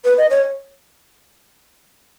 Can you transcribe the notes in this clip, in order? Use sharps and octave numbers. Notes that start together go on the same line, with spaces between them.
B4
D#5
C#5